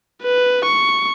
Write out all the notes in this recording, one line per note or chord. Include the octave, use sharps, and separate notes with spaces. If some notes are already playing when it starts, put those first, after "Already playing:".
B4
C#6